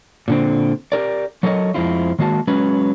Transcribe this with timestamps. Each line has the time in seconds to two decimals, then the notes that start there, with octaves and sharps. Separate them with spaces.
0.28 A#2 D3 C4
0.92 G4 A#4 D5
1.43 F#3 A4 A#4 C#5 D#5
1.74 F2 G#3 C4 E4 F4
2.19 D#3 G#3 A#3 F#4 A5
2.47 F#3 G#3 C#4 B4